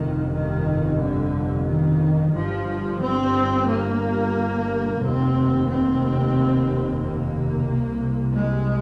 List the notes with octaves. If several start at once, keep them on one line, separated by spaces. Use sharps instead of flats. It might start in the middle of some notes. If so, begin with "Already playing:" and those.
Already playing: G1 F2 C3 D#3
D#3
D3
D#3
G1 G2 F3
C4
A#3
F1 D#2 C4
C4
A#3
C2 C3
G#3